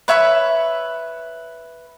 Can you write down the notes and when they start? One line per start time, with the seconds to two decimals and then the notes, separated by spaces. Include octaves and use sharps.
0.08 B4 C#5 E5 B5